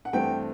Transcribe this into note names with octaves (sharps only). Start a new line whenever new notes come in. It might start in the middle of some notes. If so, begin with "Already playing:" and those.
F#5
G2 E3 A3 C4 G5